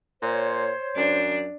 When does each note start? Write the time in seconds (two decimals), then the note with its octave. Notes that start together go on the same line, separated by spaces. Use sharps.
0.22 A#2 C5 C#5
0.96 F#2 D4